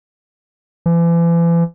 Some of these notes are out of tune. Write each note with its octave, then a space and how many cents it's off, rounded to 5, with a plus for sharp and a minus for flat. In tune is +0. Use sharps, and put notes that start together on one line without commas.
E3 +40